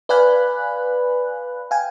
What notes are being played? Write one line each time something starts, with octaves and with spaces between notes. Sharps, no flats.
B4 D5 F5 G#5 B5 F#6
F5 G5 G#5